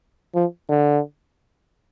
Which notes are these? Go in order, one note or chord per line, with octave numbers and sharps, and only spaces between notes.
F3
D3